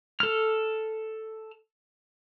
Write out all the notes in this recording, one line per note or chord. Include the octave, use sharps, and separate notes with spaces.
A4 F6